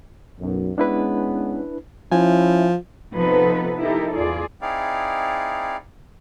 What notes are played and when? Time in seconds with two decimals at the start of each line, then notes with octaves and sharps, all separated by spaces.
0.41 B1 F#2
0.78 G#3 B3 C#4 D4 E4 B4
2.12 F3 C#4 E4 G#5
3.15 C3 F3 B3 D#4 A4 B4
3.81 D#4 E4 G4 A4 A#4
4.15 E2 F4 G#4 D5
4.61 C4 D#4 E4 G#4 D5 F5